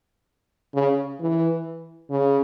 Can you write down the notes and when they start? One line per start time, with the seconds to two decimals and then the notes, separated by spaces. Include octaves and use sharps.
0.74 C#3
1.20 E3
2.11 C#3